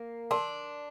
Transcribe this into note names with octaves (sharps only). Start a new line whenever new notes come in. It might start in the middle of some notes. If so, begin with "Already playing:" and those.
Already playing: A#3
D4 A#4 D5 A5 C6